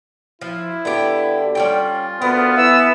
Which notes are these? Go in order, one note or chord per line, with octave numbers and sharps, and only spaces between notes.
F3 E4
D3 B3 G4
G3 C#4 F4 G5
D2 B3 A#4
E3 E6